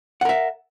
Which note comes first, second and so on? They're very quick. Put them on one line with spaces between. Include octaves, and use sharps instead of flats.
F#5 A#4 E5